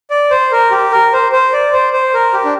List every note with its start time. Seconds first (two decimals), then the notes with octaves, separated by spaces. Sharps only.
0.10 D5
0.31 C5
0.52 A#4
0.71 G4
0.92 A#4
1.13 C5
1.32 C5
1.53 D5
1.73 C5
1.93 C5
2.14 A#4
2.33 G4
2.45 D4